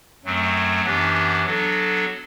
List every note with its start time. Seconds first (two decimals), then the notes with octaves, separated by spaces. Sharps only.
0.25 F#2 F#3 A3 C4
0.85 F#2 E3 B3 D4 G4
1.45 F#3 B3 D4 F#4 A4